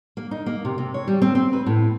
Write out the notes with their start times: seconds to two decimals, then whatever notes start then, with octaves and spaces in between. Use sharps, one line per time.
0.17 A#3
0.31 D#4
0.46 A#3
0.65 C3
0.78 C3
0.94 C#5
1.08 G3
1.22 C4
1.35 C4
1.53 B4
1.66 A2